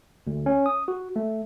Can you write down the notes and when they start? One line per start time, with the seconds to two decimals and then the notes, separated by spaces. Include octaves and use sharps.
0.27 D2
0.46 C#4
0.66 D#6
0.88 F#4
1.16 A3